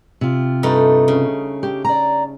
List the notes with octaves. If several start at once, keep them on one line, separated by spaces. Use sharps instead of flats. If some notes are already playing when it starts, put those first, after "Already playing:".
C3 F4
G2 A3 D#4
C#3
G4
D5 A#5